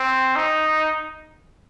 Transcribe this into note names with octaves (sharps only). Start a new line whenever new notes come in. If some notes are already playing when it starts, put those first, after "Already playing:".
Already playing: C4
D#4